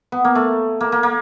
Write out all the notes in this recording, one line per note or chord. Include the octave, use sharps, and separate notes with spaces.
B3
A#3
A3
A#3
A#3
A#3